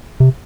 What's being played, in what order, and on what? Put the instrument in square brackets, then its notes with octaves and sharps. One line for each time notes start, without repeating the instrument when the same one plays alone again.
[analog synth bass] C3